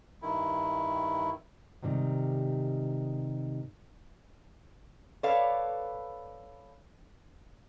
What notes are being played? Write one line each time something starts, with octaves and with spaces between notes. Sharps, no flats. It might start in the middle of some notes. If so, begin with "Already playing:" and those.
G2 D#3 E4
G#2 C3 D#3 G3
A4 B4 C#5 D5 F5